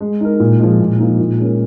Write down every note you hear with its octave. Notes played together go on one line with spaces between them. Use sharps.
G#3
D#4 A#4
A#2
F3 G#3
A#2
F3 A#3 D#4
A#2
G#3 C#4 A#4